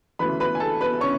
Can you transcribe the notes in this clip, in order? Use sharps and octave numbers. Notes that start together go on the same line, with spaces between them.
D2 C#3 E3 B4 B5
B4 B5
G#5
A4 A5
B4 B5
C#3 C#5 C#6